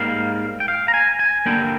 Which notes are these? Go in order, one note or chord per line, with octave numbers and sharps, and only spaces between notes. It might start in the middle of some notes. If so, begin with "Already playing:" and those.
Already playing: G#2 G3 A#3 F5
G5
F5
A#5
G#5
G#5
D3 G3 A#3 D4 G5